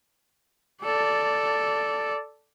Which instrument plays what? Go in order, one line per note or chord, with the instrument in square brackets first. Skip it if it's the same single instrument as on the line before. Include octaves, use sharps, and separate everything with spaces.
[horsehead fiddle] A4 D5